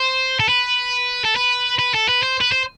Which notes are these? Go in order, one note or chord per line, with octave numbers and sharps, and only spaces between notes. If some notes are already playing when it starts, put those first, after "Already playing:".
Already playing: C5
A4
B4
A4
B4
B4
A4
B4
C5
B4
C5